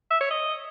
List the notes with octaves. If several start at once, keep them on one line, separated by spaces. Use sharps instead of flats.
E5
C#5
D#5